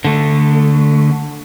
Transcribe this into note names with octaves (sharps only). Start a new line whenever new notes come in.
D3 A3